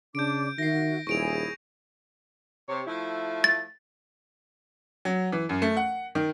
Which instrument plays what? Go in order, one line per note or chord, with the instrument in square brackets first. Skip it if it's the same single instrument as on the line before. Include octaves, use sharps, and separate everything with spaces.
[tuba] C#3 [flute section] D4 D6 [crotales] G6 D7
[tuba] D#3 [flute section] F#4 E5 [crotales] A#6 C7
[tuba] D#1 [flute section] E4 G#4 [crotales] C#6 D7 F7
[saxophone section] C3 C#5
F3 A3 E4
[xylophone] A6
[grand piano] F#3
E3
F#2
A3
F#5
D#3